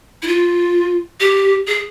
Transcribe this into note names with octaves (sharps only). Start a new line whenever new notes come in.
E4
F4
G4
G#4